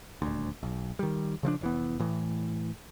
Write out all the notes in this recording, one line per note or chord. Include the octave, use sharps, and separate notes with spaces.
D#1 D2
B1
D#3 G3
C#3 F3 A3 D4
F1 E3 B3
A2 E3